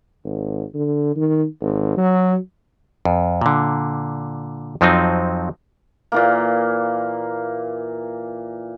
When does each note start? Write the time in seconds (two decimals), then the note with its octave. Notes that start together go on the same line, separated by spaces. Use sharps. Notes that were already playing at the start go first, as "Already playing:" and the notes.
0.25 G#1
0.74 D3
1.16 D#3
1.61 G#1
1.97 F#3
3.05 F2
3.41 A#2 D3
4.81 F2 F3 F#3 C4 D#4
6.12 A#2 E3 A#3